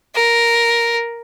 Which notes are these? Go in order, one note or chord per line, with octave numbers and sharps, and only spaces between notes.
A#4